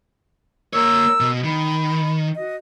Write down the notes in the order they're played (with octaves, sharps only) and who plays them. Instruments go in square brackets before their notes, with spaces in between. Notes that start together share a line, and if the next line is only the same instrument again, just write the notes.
[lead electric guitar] A#3 C#5 [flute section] A#4 E6
[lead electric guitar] B2
[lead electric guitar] D#3 [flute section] B5
[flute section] F#4 D#5